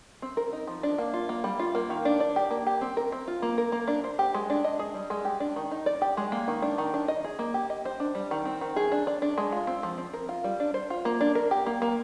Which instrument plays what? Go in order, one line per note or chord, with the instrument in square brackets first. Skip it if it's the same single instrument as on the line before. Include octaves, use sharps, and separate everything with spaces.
[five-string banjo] C4
A#4
D#4
F3
D4
A#3
F4
A#3
G3
F4
A#3
D#3
D4
D5
G4
A#3
G4
C4
A#4
C4
F4
A#3
A#4
A#3
D4
C5
G4
G#3
D4
D#5
G#4
G3
G#3
G4
D4
D#3
D#4
D5
G4
G#3
A#3
D#3
D4
D#3
D4
D#5
G#4
A#3
G4
D#5
C5
D4
G3
D#3
C4
D#3
G#4
D4
D5
D4
G#3
F4
C4
F3
C4
A#4
F4
G3
D4
C5
F4
A#3
D4
A#4
G4
A#3
A#3